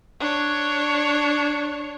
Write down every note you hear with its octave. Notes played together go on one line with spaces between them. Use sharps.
D4 C#5